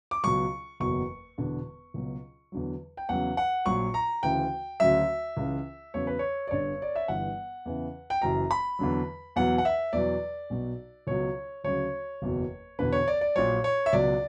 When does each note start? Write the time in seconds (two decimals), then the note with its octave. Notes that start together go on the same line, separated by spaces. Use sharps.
0.11 D6
0.24 C#2 B2 F#3 C#6
0.80 F#1 E2 B2 F#3 C#6
1.38 E1 E2 D3
1.94 C#2 B2 F#3
2.52 E2 D3 F#3
2.97 G5
3.09 E2 C#3 F#3 F#5
3.37 F#5
3.66 A#1 A#2 F#3 C#6
3.94 A#5
4.23 D2 C#3 E3 G5
4.80 D2 C#3 F#3 E5
5.37 C#2 C#3 E3
5.94 E2 C#3 F#3 C#5
6.07 B4
6.19 C#5
6.48 D5
6.51 G1 G2 D3 C#5
6.82 D5
6.96 E5
7.08 G1 G2 E3 F#5
7.65 E2 C#3 E3
8.10 G5
8.22 F#1 F#2 E3 A#5
8.51 B5
8.79 E2 D3 F#3
9.36 E2 B2 F#3 F#5
9.58 F#5
9.65 E5
9.93 E2 B2 F#3 D5
10.50 B1 B2 F#3
11.07 C#2 B2 F#3 C#5
11.64 D2 C#3 F#3 C#5
12.22 F#1 E2 B2 F#3
12.79 E1 E2 D3 B4
12.92 C#5
13.08 D5
13.21 D5
13.35 A#1 A#2 F#3 C#5
13.64 C#5
13.86 E5
13.93 C#2 B2 F#3 D5